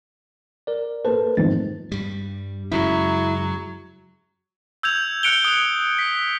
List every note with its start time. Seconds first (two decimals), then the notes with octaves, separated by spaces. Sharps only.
0.67 A#4 D5
1.05 A#3 A4 B4 C5 A5
1.37 F2 G#2 D#3 C4 A6
1.92 G2 G3
2.72 F#2 C#3 F#3 G#3 E4
4.83 E6 G6 G#6 F7
5.23 F#6 C#7 D7 F7 G7
5.45 D#6 F7
5.99 B6